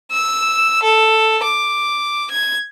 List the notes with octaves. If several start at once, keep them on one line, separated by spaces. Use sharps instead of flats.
E6
A4
D6
G#6